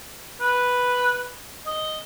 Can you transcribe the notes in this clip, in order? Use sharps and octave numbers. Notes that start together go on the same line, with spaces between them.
B4
D#5